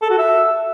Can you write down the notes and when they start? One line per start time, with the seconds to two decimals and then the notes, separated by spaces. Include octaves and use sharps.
0.02 A4
0.10 F#4
0.18 E5